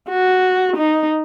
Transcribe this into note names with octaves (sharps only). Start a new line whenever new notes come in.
F#4
D#4